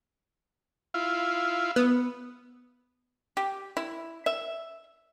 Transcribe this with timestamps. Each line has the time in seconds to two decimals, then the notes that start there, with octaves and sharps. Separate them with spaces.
0.94 E4 F4
1.76 B3
3.37 G4
3.77 E4
4.26 E5